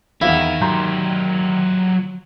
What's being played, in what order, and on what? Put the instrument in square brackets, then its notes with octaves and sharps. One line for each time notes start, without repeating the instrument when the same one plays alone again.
[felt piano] E2 E3 F5 [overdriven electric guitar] D#3 [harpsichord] E4
[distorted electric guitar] F#3 G4 [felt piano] A#5 C6 G6